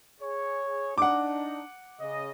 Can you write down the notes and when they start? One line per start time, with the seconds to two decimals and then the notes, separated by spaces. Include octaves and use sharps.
0.21 G#4 C#5
0.98 D4 D#4 F#5 D6
2.00 C#3 D#5